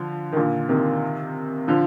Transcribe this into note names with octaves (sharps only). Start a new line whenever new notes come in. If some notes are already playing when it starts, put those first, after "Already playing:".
Already playing: D3 F3
D#3
A#2 D3
C3 D#3
D3 F3